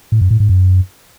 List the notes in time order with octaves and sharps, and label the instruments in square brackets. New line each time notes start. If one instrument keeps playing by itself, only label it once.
[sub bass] A2
F#2
A2
G#2
F#2